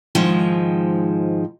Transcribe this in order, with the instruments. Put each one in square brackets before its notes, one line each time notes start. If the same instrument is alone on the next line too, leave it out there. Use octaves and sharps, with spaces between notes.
[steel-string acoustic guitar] G#2 D#3 F3 G#3